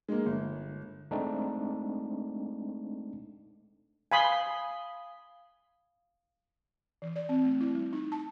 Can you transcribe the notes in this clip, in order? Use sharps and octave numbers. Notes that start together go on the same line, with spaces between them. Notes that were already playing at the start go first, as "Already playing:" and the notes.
G#3 A#3
G1
G#3 A3 C4 D4 D#4
F5 G#5 B5 C6 D#6
E3
D5
C4
A3
E4
G3
D#4
A5